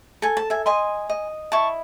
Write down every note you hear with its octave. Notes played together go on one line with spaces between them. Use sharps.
A4 G#5
A5
E5 G#5
D#5 G#5 C6
D#5
E4 A5 C#6